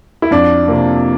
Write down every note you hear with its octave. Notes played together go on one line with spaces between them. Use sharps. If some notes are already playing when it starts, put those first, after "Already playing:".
E4
F2 D4
C3 F3 A#3